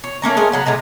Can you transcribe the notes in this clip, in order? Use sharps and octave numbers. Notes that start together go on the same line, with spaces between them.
C#5
A3 A#3 C#4 A#5
G#3 A3 C#4 A#4
C#3 F#3 B3
A2 C3 G#3 A#5